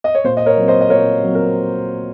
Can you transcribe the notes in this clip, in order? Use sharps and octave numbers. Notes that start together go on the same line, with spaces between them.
D#5
C#5
A#2 C5
D#5
A#4 C#5
F#3 C4
C5 D#5
D#5
A#2 A#4 C#5
F#3 C4
A#4